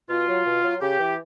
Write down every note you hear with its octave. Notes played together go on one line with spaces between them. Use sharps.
B2 F4
F#3
B2
F#3
C#3 G4
E3